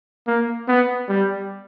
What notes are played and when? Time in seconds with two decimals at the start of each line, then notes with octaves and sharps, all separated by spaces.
0.27 A#3
0.68 B3
1.09 G3